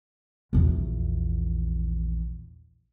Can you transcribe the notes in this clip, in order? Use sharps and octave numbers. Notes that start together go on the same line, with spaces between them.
A#1 E2